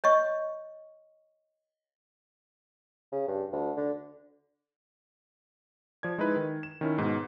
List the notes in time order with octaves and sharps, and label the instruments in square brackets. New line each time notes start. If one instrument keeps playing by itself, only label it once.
[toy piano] C#5 D#5 C#6
[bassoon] C#3
G2
D2
D3
[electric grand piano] F3 D5 G#6
G#3 D#4 E4 B4
D#3
E7
D#3 C#4 E4
G#2 B2